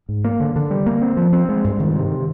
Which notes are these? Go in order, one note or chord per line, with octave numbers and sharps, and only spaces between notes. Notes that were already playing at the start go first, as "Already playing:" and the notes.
G#2
A#3
D3
D3
G3
A#3
C4
F3
C4
G#3
G2
D#3
C3